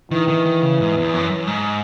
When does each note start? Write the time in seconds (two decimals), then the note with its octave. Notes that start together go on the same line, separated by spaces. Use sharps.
0.11 D#3 E3
0.28 D#3
0.46 D#3
0.62 C#3
0.80 G#2
0.97 E2
1.13 F#2
1.30 F#2
1.47 G#2